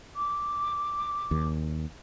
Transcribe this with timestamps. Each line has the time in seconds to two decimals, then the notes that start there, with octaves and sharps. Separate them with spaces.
0.16 D6
1.31 D#2